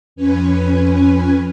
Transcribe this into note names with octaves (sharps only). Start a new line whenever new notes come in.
F2 C#4 B4 G#5